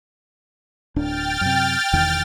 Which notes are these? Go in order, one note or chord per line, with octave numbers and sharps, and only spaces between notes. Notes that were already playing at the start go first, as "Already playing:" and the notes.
D1 D4 G5 F6 A6
F#2 C3
E1 E2 D#3